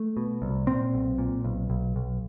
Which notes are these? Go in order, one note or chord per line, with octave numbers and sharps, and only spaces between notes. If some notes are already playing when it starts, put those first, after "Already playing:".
Already playing: A3
B2
C2
A#2 C4
B1
A#2
B1
B1
B1